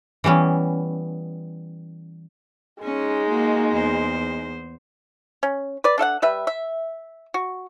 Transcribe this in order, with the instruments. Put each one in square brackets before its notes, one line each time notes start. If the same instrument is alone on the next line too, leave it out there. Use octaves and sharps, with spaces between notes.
[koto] E3 G3 B3 C#4
[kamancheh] G#3 D#4 [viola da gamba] C#4
[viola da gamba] A#3 F#4
E2 C5
[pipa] C#4
B4 D5
D4 A4 F5 F#5
G3 B4 E5
E5
F#4